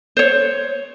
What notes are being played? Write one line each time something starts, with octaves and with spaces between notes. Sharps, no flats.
C5 C#5